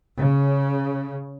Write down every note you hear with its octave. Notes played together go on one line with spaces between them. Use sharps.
C#3